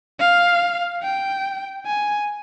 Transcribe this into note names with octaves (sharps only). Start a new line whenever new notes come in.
F5
G5
G#5